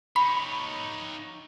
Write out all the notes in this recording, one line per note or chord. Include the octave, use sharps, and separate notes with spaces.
D#4 C#5 B5